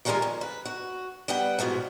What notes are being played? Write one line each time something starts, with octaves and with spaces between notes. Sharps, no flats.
D#3 F3 G3 G#3 A#4 G#5
F2
B4
F#4
G3 B3 F#5 G5
G#2 B2 E3 F3